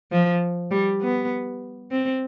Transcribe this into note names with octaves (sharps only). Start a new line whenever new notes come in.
F3
G3
B3
C4